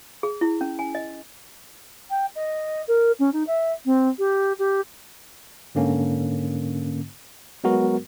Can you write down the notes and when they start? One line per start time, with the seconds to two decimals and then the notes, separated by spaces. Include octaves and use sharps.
0.23 G#4
0.41 E4
0.61 C#4
0.79 G#5
0.95 D#5
2.10 G5
2.35 D#5
2.87 A#4
3.19 C#4
3.32 D#4
3.47 E5
3.85 C4
4.18 G4
4.58 G4
5.75 G#2 D3 A#3 C#4
7.64 F#3 G#3 B3 F#4 A#4